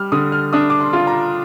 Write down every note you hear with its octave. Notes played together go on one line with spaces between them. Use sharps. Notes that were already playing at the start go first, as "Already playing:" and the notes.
Already playing: G3 F6
D3 D#6
F6
D4 D#6
D6
C6
F4
A#5